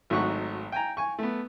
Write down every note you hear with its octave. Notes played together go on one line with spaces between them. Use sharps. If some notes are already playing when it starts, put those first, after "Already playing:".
G#1 F#3 A3 D#4 F#5 C#6
G5 G#5 A#5
G#5 C#6
A3 B3